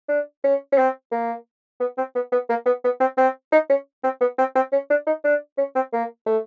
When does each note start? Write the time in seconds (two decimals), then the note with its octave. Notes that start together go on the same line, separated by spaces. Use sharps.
0.09 D4
0.44 C#4
0.72 C#4
0.78 C4
1.12 A#3
1.80 B3
1.98 C4
2.15 B3
2.32 B3
2.49 A#3
2.66 B3
2.84 B3
3.00 C4
3.17 C4
3.52 D#4
3.69 C#4
4.04 C4
4.21 B3
4.38 C4
4.55 C4
4.72 C#4
4.90 D4
5.07 D#4
5.24 D4
5.58 C#4
5.75 C4
5.93 A#3
6.26 A3